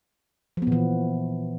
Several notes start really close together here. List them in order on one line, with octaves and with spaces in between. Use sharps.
F3 B3 A#2 E3